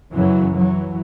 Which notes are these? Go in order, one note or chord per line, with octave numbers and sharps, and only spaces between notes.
F#2 C#3 E3 F#3
E3 F#3